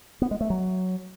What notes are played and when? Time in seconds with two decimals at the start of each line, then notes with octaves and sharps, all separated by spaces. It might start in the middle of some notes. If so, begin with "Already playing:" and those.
0.22 B3
0.31 G#3
0.41 A3
0.50 F#3